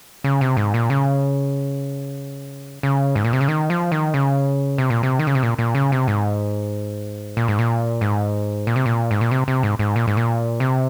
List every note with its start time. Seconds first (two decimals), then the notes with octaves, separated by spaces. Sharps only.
0.24 C#3
0.41 C3
0.57 G#2
0.74 A#2
0.90 C#3
2.83 C#3
3.15 G#2
3.24 A#2
3.33 C3
3.41 C#3
3.48 D#3
3.70 F3
3.92 D#3
4.14 C#3
4.78 C3
4.90 A#2
5.03 C3
5.19 D#3
5.27 C#3
5.35 C3
5.43 A#2
5.58 A#2
5.75 C#3
5.92 C3
6.08 G#2
7.37 A#2
7.48 G#2
7.59 A#2
8.01 G#2
8.67 A#2
8.76 C3
8.86 A#2
9.11 G#2
9.21 A#2
9.31 C3
9.48 C3
9.63 G#2
9.79 G#2
9.96 A#2
10.07 G#2
10.17 A#2
10.60 C3